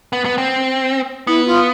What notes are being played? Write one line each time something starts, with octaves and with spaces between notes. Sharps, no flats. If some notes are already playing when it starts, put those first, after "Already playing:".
B3
B3
C4
B3 E4
F4